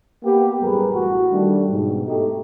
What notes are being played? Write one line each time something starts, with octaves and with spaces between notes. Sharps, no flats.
A#3 B3 G4
A1 F#2 G3 G#4 A#4 B4
A1 F#4
D#3 G3 A3 D4
G#2 B2
A3 D#4 G4